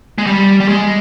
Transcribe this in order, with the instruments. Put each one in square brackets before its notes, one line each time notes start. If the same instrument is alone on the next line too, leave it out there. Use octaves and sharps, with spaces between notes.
[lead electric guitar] G#3
G3
G3
G#3